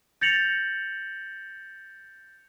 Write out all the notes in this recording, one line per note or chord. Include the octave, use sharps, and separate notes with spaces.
G6 A6 A#6 C#7 F7 F#7